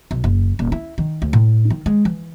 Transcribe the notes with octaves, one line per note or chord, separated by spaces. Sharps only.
B1
F#1
D#1
E4
D#3
D2
A2
D#3
G#3
E3